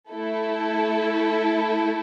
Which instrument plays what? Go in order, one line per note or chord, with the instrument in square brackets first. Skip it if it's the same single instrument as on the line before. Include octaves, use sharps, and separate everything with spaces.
[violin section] A3 E4 A4